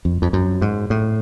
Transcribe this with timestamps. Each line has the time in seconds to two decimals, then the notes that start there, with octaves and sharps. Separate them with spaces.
0.05 F2
0.22 F2
0.33 F#2
0.62 G#2
0.90 A2